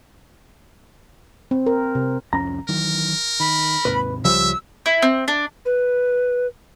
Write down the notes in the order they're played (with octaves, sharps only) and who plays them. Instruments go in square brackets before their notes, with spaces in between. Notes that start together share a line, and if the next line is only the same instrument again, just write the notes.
[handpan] C4
A#4
C3
[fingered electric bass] C2 F2 C#4 [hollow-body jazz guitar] A#5
[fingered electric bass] D#3 E3 F#3 [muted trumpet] A#4
[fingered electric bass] D#3 [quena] B5
[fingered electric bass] D#2 G#2 C3 [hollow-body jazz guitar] B4
[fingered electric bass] C#2 [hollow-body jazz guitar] C#3 F3 G3 [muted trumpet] E5 [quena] E6
[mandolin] E4
C4
D4
[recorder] B4